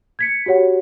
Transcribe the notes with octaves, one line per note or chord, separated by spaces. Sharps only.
G#6 B6 C#7
F#4 G4 C#5 F#5